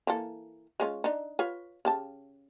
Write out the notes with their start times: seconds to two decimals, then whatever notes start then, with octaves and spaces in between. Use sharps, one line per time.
0.07 E3 A#3 A4
0.80 G#3 C#4 F4
1.04 D4 D#4
1.39 F4 B4 C#5
1.85 C#3 G4 A5